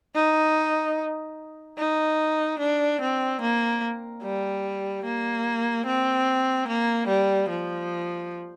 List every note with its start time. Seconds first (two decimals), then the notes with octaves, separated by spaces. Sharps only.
0.15 D#4
1.78 D#4
2.59 D4
3.01 C4
3.41 A#3
4.23 G3
5.04 A#3
5.86 C4
6.68 A#3
7.08 G3
7.49 F3